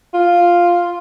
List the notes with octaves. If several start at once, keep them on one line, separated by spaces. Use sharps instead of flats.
F4